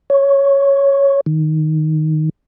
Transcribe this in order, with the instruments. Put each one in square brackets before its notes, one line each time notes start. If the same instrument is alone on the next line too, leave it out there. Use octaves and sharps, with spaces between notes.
[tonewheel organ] C#5
D#3